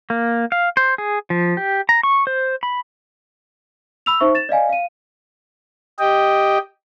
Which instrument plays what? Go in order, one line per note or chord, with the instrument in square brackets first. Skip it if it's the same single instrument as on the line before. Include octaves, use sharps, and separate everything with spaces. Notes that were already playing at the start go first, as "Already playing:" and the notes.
[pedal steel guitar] A#3
F5
C5
G#4
F3
G4
A#5
C#6
C5
B5
[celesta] B5 E6 F7
D#4 C5 E5 C#6
A6 E7
D5 D#5 F5 G#5
F5 D#7
[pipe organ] G4 D#5 G5